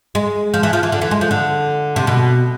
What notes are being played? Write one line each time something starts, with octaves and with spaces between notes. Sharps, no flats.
G#3
F3
E3
F3
E3
D3
E3
G#3
F3
D3
C3
B2